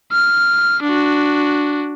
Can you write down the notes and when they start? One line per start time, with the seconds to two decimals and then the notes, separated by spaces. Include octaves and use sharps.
0.13 F6
0.83 D4 F#4